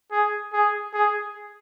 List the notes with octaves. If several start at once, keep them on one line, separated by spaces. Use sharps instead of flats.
G#4
G#4
G#4